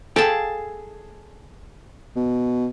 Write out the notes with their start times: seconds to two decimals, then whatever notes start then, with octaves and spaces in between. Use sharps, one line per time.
0.16 G#4 A4 F5 G5 A5
2.16 B2